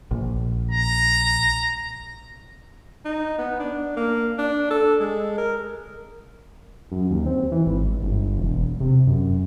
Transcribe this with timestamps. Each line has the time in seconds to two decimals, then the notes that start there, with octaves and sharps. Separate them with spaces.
0.11 A#1
0.71 A#5
3.05 D#4
3.38 B3
3.60 D4
3.96 A#3
4.38 D4
4.70 A4
5.00 G#3
5.38 A#4
6.92 F#2
7.11 D#2
7.26 C4
7.52 E3
7.67 G#1
8.04 G1
8.37 E1
8.81 C3
9.07 F#2